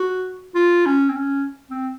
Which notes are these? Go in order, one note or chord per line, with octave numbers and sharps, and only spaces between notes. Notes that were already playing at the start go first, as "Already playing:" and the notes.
Already playing: F#4
F4
C#4
C4
C#4
C4